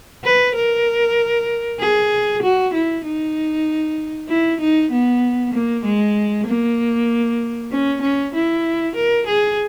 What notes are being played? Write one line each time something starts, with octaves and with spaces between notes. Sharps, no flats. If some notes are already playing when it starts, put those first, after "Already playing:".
B4
A#4
G#4
F#4
E4
D#4
E4
D#4
B3
A#3
G#3
A#3
C#4
C#4
E4
A#4
G#4